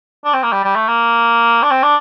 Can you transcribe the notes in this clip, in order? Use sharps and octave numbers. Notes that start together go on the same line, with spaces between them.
D4
C4
A#3
G3
G3
A3
A#3
D4
C4
D4